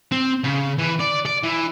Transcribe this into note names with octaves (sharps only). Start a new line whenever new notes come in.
C4
C#3
E3
D5
D5
E3